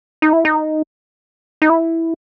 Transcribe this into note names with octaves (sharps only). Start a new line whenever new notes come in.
D#4
E4
D#4
D#4
E4